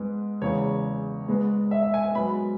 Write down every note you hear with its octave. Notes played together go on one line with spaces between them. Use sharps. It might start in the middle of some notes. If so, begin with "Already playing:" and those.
Already playing: G#2 G#3 B3
E2 C#3 G#3 C#5
G#2 G#3 B3
E5
E5
G#5
G#5
G#2 F#3 B3 B5